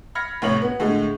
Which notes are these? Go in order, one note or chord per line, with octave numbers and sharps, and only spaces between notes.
B5 F6 G#6 A#6 C#7
F1 A2 C#5 F#7
B3
A2 D3 G#3